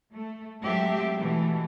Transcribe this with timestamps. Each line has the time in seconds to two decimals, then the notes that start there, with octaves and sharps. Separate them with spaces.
0.12 A3
0.62 F#3 G#3 A3 C4 G4 E5
1.17 B2 E3 G#3 A3